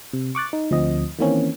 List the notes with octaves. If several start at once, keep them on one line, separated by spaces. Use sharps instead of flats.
C3
C#6 D6 F#6 A6
D#4
D2 F3 C4 D#5
D#3 E3 A#3 C4 C#4